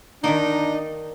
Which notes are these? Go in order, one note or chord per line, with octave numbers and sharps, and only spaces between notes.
D#3 A#3 D4 D#4